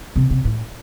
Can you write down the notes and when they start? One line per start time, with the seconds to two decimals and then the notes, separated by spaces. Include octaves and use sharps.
0.16 C3
0.30 C3
0.45 A2